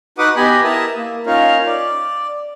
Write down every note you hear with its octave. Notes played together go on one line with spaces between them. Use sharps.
D#4 F#4 B4 F#5 D6 D#6
B3 G4 D#5 G#5 B5
E4 A#4 E5 A5 D#6
A#3
C#4 D#4 F4 A#4 C#5 F5
D5